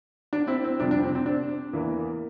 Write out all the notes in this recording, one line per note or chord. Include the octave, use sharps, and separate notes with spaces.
D4
C4 E4
C4
F2 C3 G3 D4
D4
C4
C4
D4
E2 E3 A#3